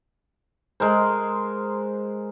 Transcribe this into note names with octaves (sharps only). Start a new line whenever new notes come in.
G#3 A#4 C5